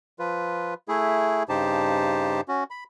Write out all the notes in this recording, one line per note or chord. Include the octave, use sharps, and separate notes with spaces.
F3 F4 B4
A3 E4 G#4
G2 C#3 D#4 G4 C5 A5
C#4 F#4
B5